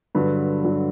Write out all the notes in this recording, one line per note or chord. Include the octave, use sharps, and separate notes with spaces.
G2 D3 F#3 B4
G2 D3 F#3